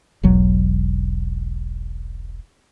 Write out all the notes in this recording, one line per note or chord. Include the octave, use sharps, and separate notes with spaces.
E1 B1 F#3